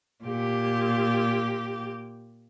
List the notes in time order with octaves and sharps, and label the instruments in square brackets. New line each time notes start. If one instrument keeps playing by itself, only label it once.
[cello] A#2 G4